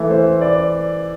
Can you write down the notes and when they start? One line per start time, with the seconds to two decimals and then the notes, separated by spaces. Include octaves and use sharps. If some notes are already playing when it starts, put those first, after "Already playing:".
Already playing: E3 A3 E4 A4
0.10 C5
0.41 D5